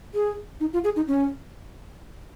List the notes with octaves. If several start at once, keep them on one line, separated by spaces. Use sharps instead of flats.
G#4
D#4
F4
G#4
D#4
C#4